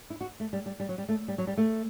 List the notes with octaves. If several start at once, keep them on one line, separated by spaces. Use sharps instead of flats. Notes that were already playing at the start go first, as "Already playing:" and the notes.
E4
F#4
A3
G3
G3
G3
F#3
G3
A3
G3
F#3
G3
A3